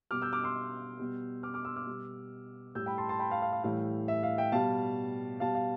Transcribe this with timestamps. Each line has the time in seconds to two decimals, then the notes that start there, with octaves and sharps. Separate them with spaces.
0.11 B2 G3 D6 F6
0.22 E6 G6
0.33 D6 F6
0.43 C6 E6
0.99 B2 G3
1.43 D6 F6
1.54 D6 F6
1.65 C6 E6
1.76 D6 F6
1.87 B2 G3
2.75 A2 G3 E6 G6
2.86 G5 B5
2.98 A5 C6
3.09 A5 C6
3.19 G5 B5
3.30 F5 A5
3.42 F5
3.52 F5
3.64 A2 E3 G3 F5
4.08 E5
4.23 F5
4.38 E5 G5
4.52 B2 G3 F5 A5
5.40 B2 G3 F5 A5
5.55 F5